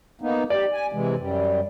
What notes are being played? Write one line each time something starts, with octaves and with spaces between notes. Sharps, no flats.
A#3 B3 D#4
G4 D5
G#5
C3 E3 G#3
F#2 G3